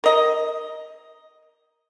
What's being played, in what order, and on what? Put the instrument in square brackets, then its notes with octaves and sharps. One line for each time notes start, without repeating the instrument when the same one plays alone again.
[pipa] A#4 D#5